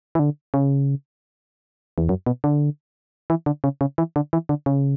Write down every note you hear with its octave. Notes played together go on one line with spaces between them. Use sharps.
E3
D3
C#3
E2
F#2
B2
D3
E3
D3
C#3
C#3
E3
D3
E3
D3
C#3